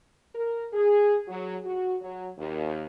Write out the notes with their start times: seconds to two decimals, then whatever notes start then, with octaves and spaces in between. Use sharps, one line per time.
0.35 A#4
0.73 G#4
1.27 F#3
1.64 F#4
2.01 F#3
2.38 D#2